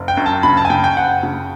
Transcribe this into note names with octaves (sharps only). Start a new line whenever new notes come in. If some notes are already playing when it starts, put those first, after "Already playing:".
Already playing: F#1
G5
F#2
A5
C#3 B5
A5
G#5
C#3 G5
G5
F#1 F#5
C#3